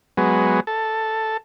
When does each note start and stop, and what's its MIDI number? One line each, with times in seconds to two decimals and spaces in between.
0.17 0.60 54
0.17 0.60 56
0.17 0.60 59
0.67 1.37 69